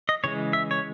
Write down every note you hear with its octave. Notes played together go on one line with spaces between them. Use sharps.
D#5
C#3 E3 G#3 C#5
E5
C#5